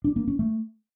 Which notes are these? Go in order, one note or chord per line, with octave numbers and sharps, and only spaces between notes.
D4
A#3
C#4
A3